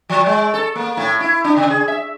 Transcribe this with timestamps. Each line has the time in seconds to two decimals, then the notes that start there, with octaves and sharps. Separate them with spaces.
0.09 F3
0.26 G#3
0.54 A4
0.75 A#3
0.97 A2
1.21 E4
1.44 D4
1.57 C#3
1.70 G#4
1.88 E5